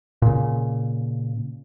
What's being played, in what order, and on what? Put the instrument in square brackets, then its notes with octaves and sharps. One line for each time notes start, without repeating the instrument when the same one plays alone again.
[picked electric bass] A#2 C#3